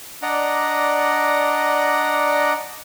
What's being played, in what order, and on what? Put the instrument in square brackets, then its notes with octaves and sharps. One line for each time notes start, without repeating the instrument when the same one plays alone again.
[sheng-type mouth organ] D4 D5 D#5 F#5 A#5